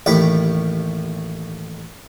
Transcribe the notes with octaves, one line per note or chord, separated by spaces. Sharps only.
A1 D#2 A2 G4 G5 B5